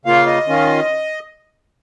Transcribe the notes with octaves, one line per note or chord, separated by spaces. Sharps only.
C#3 A#3 F4 F5
D#5
D#3 C#4 F4